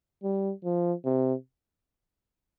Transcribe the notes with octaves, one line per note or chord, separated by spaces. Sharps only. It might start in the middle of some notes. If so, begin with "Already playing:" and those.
G3
F3
C3